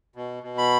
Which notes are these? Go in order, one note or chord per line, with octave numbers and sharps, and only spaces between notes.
B2
B2
B5